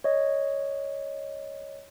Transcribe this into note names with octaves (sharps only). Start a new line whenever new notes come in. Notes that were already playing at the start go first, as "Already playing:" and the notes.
C#5 D#5